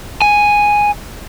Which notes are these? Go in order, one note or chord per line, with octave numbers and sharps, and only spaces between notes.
G#5